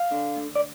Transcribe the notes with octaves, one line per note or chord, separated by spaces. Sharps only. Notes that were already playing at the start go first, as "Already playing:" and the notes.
Already playing: F5
D3
D2
D5